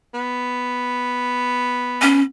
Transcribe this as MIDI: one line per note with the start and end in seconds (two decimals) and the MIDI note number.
0.14 2.24 59
2.02 2.21 61